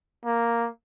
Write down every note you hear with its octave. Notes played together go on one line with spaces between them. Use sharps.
A#3